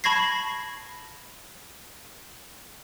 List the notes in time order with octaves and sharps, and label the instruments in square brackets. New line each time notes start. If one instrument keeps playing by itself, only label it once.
[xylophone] A5 B5 C#6 G#6 A#6 C7